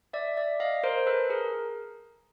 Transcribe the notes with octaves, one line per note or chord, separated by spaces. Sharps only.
D5 E5
D5 E5
D#5 F5
A#4 C5
A4 B4
G#4 A#4